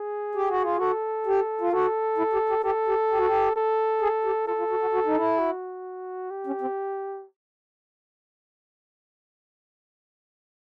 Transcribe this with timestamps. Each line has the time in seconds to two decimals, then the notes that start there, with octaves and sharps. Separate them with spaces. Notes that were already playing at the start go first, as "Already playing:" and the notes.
Already playing: G#4
0.35 G4
0.49 F#4
0.63 F4
0.77 F#4 A4
1.26 G4
1.61 F4
1.72 F#4 A4
2.18 E4
2.33 G4
2.49 G4
2.64 G4 A4
2.87 G4
3.10 G4
3.18 F#4
3.26 G4
3.56 A4
4.01 G#4
4.24 G4
4.47 F4 A4
4.59 F4
4.70 F#4
4.81 F#4
4.93 F#4
5.06 D#4
5.16 E4
5.39 F#4
6.31 G4
6.47 C#4
6.61 C4